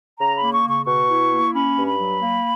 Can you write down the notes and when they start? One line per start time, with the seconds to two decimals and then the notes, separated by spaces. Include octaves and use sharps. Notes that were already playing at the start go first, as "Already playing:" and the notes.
0.19 C#3 A#5
0.36 B5
0.41 A#3
0.53 C#6
0.64 C#3
0.70 C#6
0.86 B2 C#6
1.09 E4
1.31 A#3
1.54 C#4 B5
1.76 G2
1.87 B5
1.99 F#3
2.21 A#3